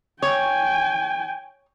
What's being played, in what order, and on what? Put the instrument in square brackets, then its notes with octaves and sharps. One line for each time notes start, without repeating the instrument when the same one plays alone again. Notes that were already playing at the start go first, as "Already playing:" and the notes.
[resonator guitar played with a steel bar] C#5 [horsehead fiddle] G5 G#5